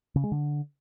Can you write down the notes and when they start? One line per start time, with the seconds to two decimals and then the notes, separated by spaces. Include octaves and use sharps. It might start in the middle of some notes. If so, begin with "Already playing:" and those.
0.16 C#3
0.24 G#3
0.32 D3